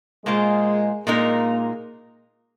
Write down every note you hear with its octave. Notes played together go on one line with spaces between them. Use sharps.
A#2 G#3 A#3 F4 C5
A#2 G#3 A#3 D#4 A#4